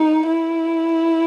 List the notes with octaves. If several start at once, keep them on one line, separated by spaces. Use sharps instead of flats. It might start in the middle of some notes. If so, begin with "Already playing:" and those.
Already playing: D#4
E4